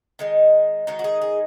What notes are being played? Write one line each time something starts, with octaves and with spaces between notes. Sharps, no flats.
D#3 G#3 D#4
D#3 G#3 D#4 F#4
F#4
G#4
G#4